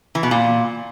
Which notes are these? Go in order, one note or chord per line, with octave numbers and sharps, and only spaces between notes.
E3
B2
A#2